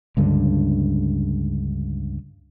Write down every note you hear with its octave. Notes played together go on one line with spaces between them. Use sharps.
C#2 G2 D3